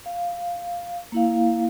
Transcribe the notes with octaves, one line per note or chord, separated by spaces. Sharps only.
F5
A#3 E4 F5